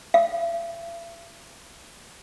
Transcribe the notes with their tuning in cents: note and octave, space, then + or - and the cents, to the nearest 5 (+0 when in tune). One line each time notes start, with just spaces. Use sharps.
E5 +45